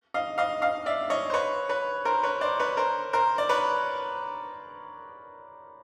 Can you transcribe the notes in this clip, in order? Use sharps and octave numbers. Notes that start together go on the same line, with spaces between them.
D#5 F5
D#5 F5
D#5 F5
D5 E5
C#5 D#5
C5
B4 C#5
B4 C#5
A#4 C5
B4 C#5
C5 D5
B4 C#5
A#4 C5
A#4 C5
D5
B4 C#5